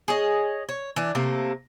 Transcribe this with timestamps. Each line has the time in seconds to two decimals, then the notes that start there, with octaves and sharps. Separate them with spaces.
0.08 G#4 C#5 D#5
0.69 C#5
0.96 E3 D4
1.15 C3 A3 A#3